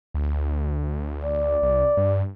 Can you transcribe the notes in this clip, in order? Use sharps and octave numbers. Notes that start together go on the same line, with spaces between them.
D2
D5
C2
G2